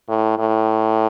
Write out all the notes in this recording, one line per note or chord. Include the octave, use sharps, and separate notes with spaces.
A2
A2